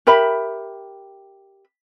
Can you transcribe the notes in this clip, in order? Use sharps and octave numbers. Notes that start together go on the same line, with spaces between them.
G4 A#4 E5 B5